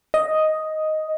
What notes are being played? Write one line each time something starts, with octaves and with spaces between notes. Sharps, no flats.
D#5